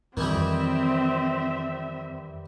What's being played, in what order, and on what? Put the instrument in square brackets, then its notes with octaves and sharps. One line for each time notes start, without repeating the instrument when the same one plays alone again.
[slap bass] F2 [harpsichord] D#3 E3 G3 [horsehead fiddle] C4 E5